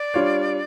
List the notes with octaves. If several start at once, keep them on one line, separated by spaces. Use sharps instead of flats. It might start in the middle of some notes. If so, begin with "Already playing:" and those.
Already playing: D5
G3 D4 F4 C#5